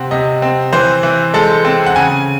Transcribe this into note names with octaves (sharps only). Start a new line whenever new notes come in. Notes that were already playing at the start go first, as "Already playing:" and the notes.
Already playing: C3 C4 F#5
C3 D#5
C4
E3 C5
E3
G#3 A4
C4
F#5
C#3 G#5